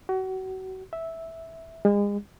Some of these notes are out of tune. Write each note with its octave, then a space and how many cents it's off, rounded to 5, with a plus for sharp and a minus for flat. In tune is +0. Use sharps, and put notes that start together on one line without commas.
F#4 +30
E5 -10
G#3 -35